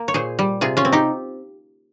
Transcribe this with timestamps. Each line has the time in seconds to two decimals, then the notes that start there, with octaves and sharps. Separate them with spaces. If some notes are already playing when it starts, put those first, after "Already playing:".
Already playing: A#3
0.08 C#5
0.14 A#2 G#4 C5
0.39 G3
0.61 C3 F4 G#4
0.77 C#4 F4
0.85 C4
0.92 D#4 G4